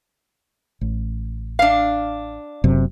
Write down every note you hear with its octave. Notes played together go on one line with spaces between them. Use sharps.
A1
D4 F5
F#1 F#2 C3